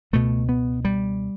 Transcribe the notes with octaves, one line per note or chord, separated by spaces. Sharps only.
C#2 B2 A3
B3
G3